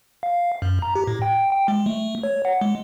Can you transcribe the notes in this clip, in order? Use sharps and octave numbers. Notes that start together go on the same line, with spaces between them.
F5
F#2
A#5
G4
A2
G5
G5
G#3
A3
C#5
F#5
G#3